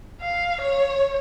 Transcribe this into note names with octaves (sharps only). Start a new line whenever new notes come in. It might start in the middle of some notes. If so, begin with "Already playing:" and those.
F5
C#5